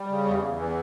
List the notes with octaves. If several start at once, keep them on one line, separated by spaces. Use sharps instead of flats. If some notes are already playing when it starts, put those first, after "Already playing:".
Already playing: G3
C#3
E2
E2
E3